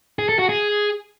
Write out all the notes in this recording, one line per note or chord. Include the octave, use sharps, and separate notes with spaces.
G#4
A4
F#4
G#4